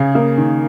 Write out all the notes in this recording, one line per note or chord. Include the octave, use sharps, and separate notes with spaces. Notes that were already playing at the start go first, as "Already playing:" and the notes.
Already playing: C#3 G#4
A#3
D#3